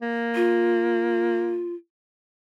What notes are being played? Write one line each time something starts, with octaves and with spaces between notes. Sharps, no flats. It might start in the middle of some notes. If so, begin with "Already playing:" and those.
A#3
F4